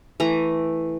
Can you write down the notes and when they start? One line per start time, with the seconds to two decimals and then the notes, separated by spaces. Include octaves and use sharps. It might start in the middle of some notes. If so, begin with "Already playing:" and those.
0.20 E3 A3 A#5